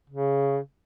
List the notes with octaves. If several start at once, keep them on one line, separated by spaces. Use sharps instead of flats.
C#3